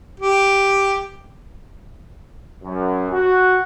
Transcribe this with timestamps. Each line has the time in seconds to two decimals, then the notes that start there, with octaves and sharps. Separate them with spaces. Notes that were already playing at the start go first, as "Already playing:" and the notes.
0.20 G4
2.64 F#2
3.12 F#4